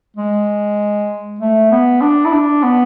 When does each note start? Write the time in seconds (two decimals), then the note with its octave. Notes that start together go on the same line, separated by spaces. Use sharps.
0.17 G#3
1.41 A3
1.71 B3
2.01 D4
2.25 E4
2.32 D4
2.63 B3